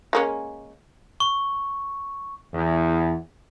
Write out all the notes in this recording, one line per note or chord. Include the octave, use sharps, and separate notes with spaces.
G#3 A#3 C#4
C#6
E2